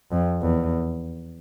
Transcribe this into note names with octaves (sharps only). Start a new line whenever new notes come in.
F2
E2